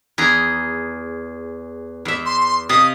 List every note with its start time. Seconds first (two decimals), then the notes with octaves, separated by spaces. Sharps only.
0.18 E2 G#4 A#5
2.05 E2 E5
2.26 C6
2.69 C3 D#5 F5 D#6